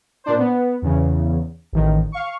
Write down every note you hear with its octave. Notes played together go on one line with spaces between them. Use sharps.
A#2 D4 C5
B3
E2 C#3
A1 D#3
F5 C#6